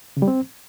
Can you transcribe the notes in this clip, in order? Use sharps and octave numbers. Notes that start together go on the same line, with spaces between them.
C#3
G3
C4